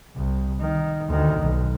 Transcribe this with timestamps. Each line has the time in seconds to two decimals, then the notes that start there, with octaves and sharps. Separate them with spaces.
0.16 C2
0.61 D#3
1.08 D2 D#3
1.40 B1